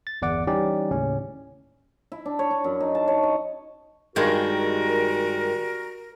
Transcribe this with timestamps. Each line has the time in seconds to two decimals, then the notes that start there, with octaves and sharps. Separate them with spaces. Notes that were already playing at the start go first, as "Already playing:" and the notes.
0.07 A6
0.22 G1 E2 D5 F#5 D6
0.47 E3 G3 C#4 D#4 G4 D5
0.91 D#2 A2 C#3 C#4
2.12 E4
2.26 D4
2.39 C#5
2.51 D4
2.64 F#2
2.80 D#4
2.95 A5
3.08 C#5
3.23 D#5
4.16 G2 D#3 G3 G#3 F#4 A#4